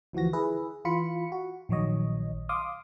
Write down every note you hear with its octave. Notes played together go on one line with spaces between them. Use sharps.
D2 E3 F3 F#4 A#6
E4 G#4 B4 E5
E3 F4 B5 C#7
F#4
A#1 D#3 F#3 C#5 D#5
F5 C6 D6 D#6